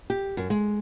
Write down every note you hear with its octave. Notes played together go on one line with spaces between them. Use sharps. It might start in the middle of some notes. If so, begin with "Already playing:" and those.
G4
F#2
G#3